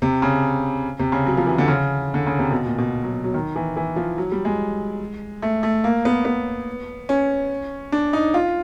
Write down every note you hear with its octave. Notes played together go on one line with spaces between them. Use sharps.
C3
C#3
C3
C#3
F#3
F3
E3
D3
C#3
D3
C#3
C3
B2
A#2
B2
F#3
F#3
D#3
E3
E3
F3
F#3
G3
G#3
A3
A3
A#3
B3
B3
C#4
D4
D#4
F4